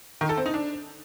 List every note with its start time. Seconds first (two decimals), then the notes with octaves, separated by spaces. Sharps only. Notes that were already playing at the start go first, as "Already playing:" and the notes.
0.21 D#3
0.29 A4
0.37 C4
0.46 D#4
0.54 D4